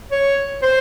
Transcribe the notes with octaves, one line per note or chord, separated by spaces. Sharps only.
C#5
C5